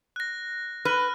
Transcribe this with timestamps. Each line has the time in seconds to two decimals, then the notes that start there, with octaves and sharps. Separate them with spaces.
0.16 F#6 A#6
0.85 B4 F6 F#6